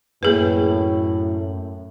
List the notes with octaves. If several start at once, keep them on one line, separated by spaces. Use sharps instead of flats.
F#2 A2 A#3 G#4 B4